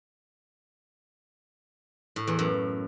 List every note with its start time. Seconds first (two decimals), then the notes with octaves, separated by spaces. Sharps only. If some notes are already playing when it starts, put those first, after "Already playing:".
2.16 A2
2.27 E2
2.39 F#2